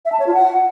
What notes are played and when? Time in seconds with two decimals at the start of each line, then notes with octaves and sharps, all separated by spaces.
0.05 E5
0.12 A5
0.19 C#5
0.27 F4
0.34 F#5